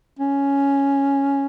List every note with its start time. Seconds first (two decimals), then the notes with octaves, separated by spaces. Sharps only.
0.19 C#4